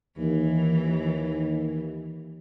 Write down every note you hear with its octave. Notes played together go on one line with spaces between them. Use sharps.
D#2 E3